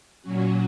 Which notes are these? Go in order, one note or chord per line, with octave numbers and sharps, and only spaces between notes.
A#2 F#3 C#4 F#4